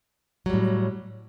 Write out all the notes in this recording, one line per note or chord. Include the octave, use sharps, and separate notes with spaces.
A2 F#3 G3